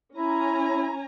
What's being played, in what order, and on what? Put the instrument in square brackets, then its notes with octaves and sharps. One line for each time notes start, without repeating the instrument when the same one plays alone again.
[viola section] C#4 G#5 A#5 [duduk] E4